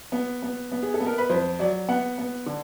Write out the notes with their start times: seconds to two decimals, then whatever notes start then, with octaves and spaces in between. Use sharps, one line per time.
0.12 B3
0.42 B3
0.72 B3
0.83 G#4
0.94 A4
1.00 B3
1.07 A#4
1.18 B4
1.29 F2 C5
1.59 F#3 D5
1.88 B3 F#5
2.18 B3
2.46 D3